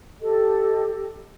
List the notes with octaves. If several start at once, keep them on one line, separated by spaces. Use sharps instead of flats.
G4 A4 D#5